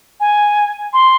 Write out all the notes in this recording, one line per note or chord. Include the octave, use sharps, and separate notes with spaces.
G#5
C6